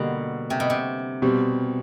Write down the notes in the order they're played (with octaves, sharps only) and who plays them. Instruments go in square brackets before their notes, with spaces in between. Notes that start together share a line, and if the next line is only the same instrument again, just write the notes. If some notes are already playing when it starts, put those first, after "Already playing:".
Already playing: [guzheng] B2 [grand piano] D3 G3 A#3
[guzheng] C3
B2
C3
[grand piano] B2 G3 C4